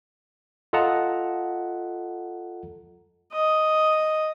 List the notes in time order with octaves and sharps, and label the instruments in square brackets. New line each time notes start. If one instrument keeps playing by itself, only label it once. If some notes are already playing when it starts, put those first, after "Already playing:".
[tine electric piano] F4 A4 D#5 F#5 A5 A#5
[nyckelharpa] D#5